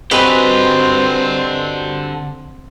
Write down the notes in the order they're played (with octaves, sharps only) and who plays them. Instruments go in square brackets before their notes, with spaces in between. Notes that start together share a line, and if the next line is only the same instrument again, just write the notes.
[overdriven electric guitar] D3 G4 [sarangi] C4 [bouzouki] F#4 G#5 [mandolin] B4 D#5